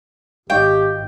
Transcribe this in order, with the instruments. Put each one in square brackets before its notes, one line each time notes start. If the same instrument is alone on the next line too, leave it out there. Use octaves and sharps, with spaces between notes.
[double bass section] G#1 [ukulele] D#4 C#5 F5 [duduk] G4 [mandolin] G5